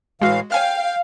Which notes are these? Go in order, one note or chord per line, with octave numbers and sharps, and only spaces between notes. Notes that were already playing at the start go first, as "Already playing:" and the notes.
A2 E3 G#3 F#4 F5
C#5 F5 G5 G#5 F6